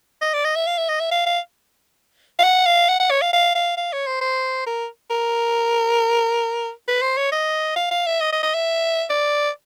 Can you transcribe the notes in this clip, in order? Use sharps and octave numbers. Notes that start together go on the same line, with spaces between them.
D#5
D5
D#5
E5
F5
E5
D#5
E5
F5
F5
F5
F#5
F5
F#5
F#5
C#5
F5
F5
F5
F5
C#5
C5
C5
A#4
A#4
B4
C5
C#5
D#5
F5
F5
E5
D#5
D#5
D#5
E5
D5